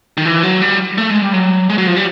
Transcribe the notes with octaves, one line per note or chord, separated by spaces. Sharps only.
D#3
E3
F#3
G3
A3
G#3
G3
F#3
G#3
F#3
F3
G3